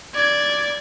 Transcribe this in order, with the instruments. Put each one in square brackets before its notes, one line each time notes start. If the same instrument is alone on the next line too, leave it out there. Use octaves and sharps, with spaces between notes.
[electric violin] D5 G#6